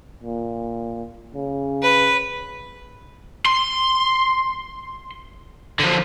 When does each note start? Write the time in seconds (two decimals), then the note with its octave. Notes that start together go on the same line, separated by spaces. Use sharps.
0.23 A#2
1.35 C#3
1.82 B4
3.46 C6
5.79 D3 F3